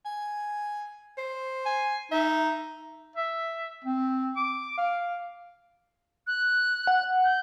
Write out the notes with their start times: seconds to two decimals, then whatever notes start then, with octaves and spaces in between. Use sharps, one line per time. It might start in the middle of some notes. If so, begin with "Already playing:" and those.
0.05 G#5
1.18 C5
1.66 G#5
2.12 D#4 E5
3.16 E5
3.85 C4
4.36 D6
4.78 F5
6.27 F#6
6.87 F#5
7.24 G6